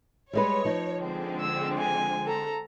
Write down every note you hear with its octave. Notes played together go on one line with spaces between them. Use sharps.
G3 G#3 B4 C#5
F3 D#4
D3 G#3 C4
E6
G#5
A4 A#5